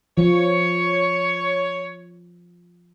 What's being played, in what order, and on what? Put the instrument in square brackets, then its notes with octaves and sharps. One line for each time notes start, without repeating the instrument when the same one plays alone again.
[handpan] F3 [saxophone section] C#5